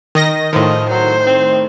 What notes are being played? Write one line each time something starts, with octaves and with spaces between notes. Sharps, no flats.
D#3 D#5 A#6
A2 D#3 F3 D#5
F#3 C5
C4